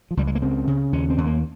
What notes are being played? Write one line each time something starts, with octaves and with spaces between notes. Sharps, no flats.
F3
C#2 G3
G#3
A#3
C#3 C4
C#3
D#2 C#4
C4
D#2
A#3